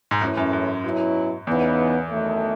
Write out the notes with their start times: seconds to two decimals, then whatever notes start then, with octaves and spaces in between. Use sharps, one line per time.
0.11 G#2
0.21 F#2 A2 E3 A3 C#4 E4
0.37 F#2
0.53 F#2
0.84 B2 F#3 C#4 E4
1.47 E2 C#3 E3 B3 D#4
2.10 F#2 D#3 A3